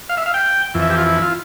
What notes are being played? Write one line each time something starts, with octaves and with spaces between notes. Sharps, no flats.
F5
E5
F5
G5
F2 E3
E5
G4
F4
E4
F4